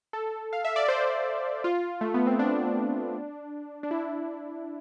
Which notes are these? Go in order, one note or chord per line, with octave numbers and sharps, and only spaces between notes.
A4
F5
E5
D5
C5
F4
A3
B3
C4
D4
D4
E4